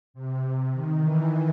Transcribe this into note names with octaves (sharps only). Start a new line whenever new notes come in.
C3
C3
D#3
E3